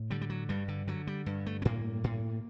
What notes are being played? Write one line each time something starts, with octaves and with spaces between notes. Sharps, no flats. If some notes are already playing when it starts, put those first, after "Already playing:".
Already playing: A2
D3 G3
G3
F#3
G2 G3
D3
D3 F#3
G3
G2
A3
C4
A2 A#3
A2